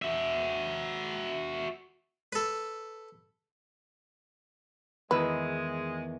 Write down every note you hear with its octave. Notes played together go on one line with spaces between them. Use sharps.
F#4 E5
A4 B4
E2 D#3 G#3 B4 E6